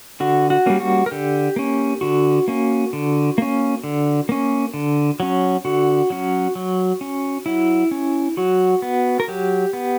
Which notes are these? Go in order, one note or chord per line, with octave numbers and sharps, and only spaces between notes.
D3 F#4
F#4
G3 A#3 C#4
F#4
A#4
D3 G4
A#3 C#4
D3 F#4
A#3 C#4
D3
A#3 C#4
D3
A#3 C#4
D3
F#3 C#4
D3 F#4
F#3 C#4
F#3
C#4
F#3 E4
C#4
F#3 F#4
B3
A#4
F#3 G4
B3